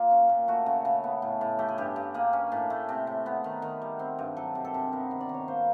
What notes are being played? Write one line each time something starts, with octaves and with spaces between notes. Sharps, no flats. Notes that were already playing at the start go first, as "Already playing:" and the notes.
Already playing: A#3 F4
C#4
A#2
A3 F#4
C#3
C#3
B3
A2
A2
A3 G4
G#4
G2 G4
G2
A#3 G#4
C#4
A2
A3
C3
C3
B3
D#3
D#3
G3
C4
G2
F#3 A4
C3
A4
C3
B3 A#4
D#3
D5
D#3
C#5
A#3 C5